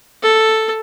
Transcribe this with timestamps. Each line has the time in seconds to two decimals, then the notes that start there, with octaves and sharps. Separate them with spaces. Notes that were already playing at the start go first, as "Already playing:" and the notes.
0.23 A4